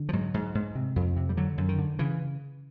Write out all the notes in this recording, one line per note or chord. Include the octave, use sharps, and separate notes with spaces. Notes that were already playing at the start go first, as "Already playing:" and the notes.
Already playing: D3
F3
G#2 F#3
G#2
G#2
C3
F2
C3
G3
D3 F#3
F#2
D#3
D3
C#3 E3